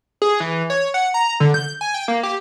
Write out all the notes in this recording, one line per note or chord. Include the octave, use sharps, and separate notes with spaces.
G#4
E3
C#5
F#5
A#5
D3
G6
G#5
G5
A#3
G4